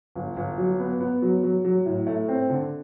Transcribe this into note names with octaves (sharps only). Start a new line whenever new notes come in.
G1
G1
F#3
B3
B3
F#3
F#3
F#3
A2
A3
C4
D3